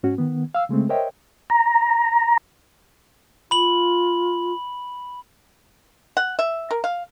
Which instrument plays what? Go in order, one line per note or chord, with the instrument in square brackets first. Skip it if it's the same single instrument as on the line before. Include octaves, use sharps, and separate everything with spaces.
[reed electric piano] G#2 C#4 F#4
D#3 B3
F5 E6
C#3 G#3 A3 C4
A#4 C5 C#5 D#5 E5 G5
[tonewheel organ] A#5
[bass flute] F4 [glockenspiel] B5 F#7
[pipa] F#5
E5
A#4
F5